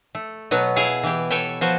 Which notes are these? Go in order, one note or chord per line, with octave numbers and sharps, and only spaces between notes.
A3
B2 F#3 B3
E4 G#4 F5 F#5
E3 G4
A4 B4 C#5 E5 G5
F3 B3 F#4 C5